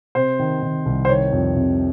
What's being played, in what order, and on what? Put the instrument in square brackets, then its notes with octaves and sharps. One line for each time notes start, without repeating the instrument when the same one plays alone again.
[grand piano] C3 C5
D#3
D#3
C2
C5
D#3 C#5
F2
C3